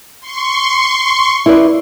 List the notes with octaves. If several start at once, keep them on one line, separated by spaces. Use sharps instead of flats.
C6 C#6
E4 B4 D5